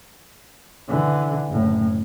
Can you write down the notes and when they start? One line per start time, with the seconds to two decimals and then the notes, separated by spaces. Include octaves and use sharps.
0.89 D3 E3
1.48 F#1 A2